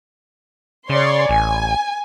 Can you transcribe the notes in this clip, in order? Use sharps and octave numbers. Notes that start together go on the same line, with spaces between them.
C#3 C#5 D5 C6
A1 G#5